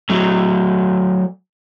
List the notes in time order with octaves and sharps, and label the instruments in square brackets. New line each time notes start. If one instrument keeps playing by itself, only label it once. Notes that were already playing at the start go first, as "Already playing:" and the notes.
[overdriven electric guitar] F#3 A3